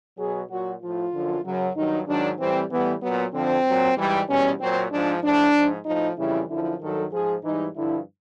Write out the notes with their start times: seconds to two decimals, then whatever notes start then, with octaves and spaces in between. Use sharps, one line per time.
0.18 B2 F#3 G#4
0.49 A#2 F#3 F#4
0.81 A2 F3 F4
1.12 F#2 D3 F3
1.44 F#2 C#3 F#3
1.75 G2 D#3 F#3 D#4
2.07 G#2 D#3 F#3 D4
2.39 A2 E3 G3 C4
2.70 A2 E3 G3 B3
3.01 A#2 F#3 B3
3.33 F2 D3 F3 C4
3.65 A#2 F#3
3.97 G#2 E3 G3
4.28 E2 B2 G3 C#4
4.59 A#2 F#3 C4
4.90 G#2 F3 D4
5.22 A2 F3 D4
5.54 G#2 F3
5.85 A2 F3 D#4
6.17 F2 C#3 E3 G3 E4
6.49 F#2 D3 F3 E4
6.80 G2 D#3 F#3 A4
7.12 G#2 F3 G#4
7.43 G#2 E3 G3 D#4
7.74 G2 D3 F3 E4